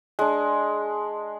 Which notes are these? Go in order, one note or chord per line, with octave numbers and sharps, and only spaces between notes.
G#3 D4